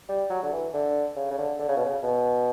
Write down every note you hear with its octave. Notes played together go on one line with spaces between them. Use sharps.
G3
F#3
D3
E3
D3
C#3
C#3
D3
D3
C#3
B2
C#3
B2